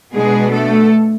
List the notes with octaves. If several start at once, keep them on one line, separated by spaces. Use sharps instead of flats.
B2 G#3 B3 D4 G#4
A3 A4